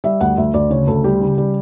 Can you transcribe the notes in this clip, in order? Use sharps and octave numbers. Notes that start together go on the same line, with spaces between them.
G3 E5
D2 F#5
D2 E5
D2 D5
C#3 C#5
D2 A4
G3 G4
C#3
G3